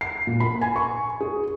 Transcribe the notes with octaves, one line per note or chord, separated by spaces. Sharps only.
C7
A#2
B5
G#5
C#6
G#4